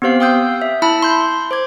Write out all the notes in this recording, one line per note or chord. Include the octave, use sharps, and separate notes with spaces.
B3 C4 G4 C5 F5 C7
F5 G5 D#6 E6 G6
E5
E4 A5 B5 E6
C6 G6
C5 D6 G#6